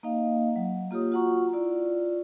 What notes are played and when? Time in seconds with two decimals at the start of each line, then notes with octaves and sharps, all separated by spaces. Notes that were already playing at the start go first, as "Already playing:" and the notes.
0.03 A#3 D#4 D#5 F5
0.56 F#3
0.91 A#3 F4 G4 C#5 D#6
1.12 F4 F#4 F#5 A#5 C#6
1.53 E4 F4 D5